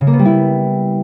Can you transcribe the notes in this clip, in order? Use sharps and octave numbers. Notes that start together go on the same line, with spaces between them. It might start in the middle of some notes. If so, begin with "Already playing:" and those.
C#3
A#3
B3
G3
E4